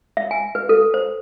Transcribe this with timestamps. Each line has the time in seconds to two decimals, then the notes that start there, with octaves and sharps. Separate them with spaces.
0.17 E5
0.31 G#5
0.55 B4
0.69 A4
0.94 C5